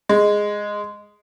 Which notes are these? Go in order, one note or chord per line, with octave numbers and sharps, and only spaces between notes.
G#3